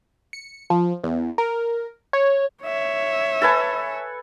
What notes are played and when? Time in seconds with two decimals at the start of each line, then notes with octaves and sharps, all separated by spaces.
0.33 C#7
0.70 F3
1.04 E2
1.38 A#4
2.13 C#5
2.64 C#5 E5
3.42 A4 B4 G#5